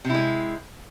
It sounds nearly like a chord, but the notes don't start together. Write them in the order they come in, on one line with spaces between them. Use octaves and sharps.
C3 E4 G#3